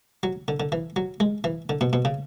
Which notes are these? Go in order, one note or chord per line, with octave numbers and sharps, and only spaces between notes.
F#3
D3
D3
E3
F#3
G#3
E3
D3
B2
B2
C#3